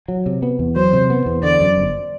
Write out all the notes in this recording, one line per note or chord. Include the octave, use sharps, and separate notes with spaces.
F#3
C3
B3
E2
F#3 C5
C3
B3
E2
D3 D5
F#2
G1